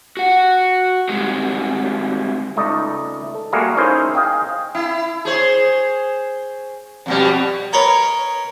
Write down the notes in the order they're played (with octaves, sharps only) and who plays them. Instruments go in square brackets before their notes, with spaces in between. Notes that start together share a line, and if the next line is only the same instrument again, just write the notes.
[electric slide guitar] F#4 F#5
G3 G#3 C4 D#4 F#4 G4
[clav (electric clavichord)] C#2 A3 D#4 D5 D#5
A4
G3 A3 A#3 F#4 G#4 A#4
C#4 D#4 E4 G#4 A#4 C5
G#4 D#5 F5 G5
[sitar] E4
G#4 C5 C#5
F2 B2 G3
[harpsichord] A#4 B4 C#5 D#5 A#5